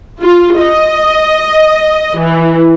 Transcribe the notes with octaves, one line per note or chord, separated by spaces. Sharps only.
F4
D#5
E3